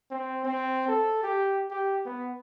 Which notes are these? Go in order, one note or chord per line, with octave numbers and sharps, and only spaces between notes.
C4
C4
A4
G4
G4
B3